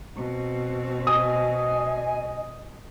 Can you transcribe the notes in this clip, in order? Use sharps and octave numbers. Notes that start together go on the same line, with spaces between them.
B2 C4
D#5 G#5 D#6